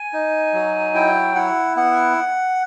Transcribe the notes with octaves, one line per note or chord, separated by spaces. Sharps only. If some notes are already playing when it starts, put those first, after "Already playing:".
Already playing: G#5
D#4
F#3
E4 G5
E4 F#5
B3 F#5